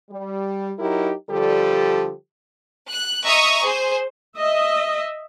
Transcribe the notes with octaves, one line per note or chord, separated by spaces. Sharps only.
G3
F#3 D#4 E4 G4 A#4
D3 F3 G3 G4 A4
F#6
D#5 E5 A#5 C#6 D#6
G#4 C5
D#5 E5